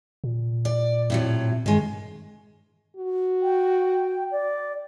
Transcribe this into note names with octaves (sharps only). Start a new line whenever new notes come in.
A#2
D5
A2 C3 F#3
G2 D#3 G#3
F#4
G5
D5